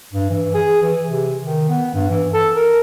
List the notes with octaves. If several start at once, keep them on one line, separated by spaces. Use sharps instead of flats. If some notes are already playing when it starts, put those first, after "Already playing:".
G2
E3
G#4
E3
C3
D#3
B3
G2
E3
A4
A#4